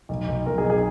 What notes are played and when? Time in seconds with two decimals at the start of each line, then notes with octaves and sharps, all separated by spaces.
0.09 B1
0.27 B1
0.46 B1 A#4
0.58 G#4
0.64 B1
0.70 G#4